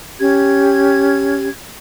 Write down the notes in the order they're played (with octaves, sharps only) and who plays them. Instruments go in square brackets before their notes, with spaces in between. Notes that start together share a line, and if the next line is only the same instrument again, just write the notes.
[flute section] C#4 G4 G#6